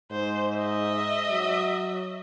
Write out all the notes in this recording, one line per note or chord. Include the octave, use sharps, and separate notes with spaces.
G#2 C5
D#5 E5
F#3